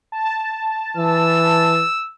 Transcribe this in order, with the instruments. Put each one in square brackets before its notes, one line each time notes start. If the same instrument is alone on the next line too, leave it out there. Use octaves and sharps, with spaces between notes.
[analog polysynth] A5
[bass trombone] E3 [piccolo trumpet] E6